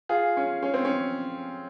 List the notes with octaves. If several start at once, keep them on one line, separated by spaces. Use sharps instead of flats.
F4 G#4
C#4
C#4
C4
C#4